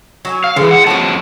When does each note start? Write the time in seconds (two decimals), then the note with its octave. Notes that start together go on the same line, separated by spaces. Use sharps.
0.25 F#3 D#5 G#5
0.44 F5
0.56 C#3 E3 G#3 A4 D#5
0.71 F#5
0.87 F2 F3 C4 F#4 C#5 A5